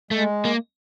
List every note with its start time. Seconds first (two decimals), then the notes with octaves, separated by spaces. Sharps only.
0.11 G#3 A3
0.45 A#3